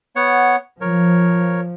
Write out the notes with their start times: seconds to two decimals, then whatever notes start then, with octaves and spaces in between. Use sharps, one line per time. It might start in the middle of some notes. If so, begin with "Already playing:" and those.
0.16 B3 C#5 F#5
0.81 F3 A#4 C#5